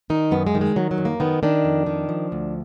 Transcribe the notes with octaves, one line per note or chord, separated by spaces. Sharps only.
D#3 D#4
F#2 B3
G#3
D#3
G#3
D#3 F#3
F#3
F#2
A#3
D#3 B3
D#3 D4
F2
D#3
F3
D2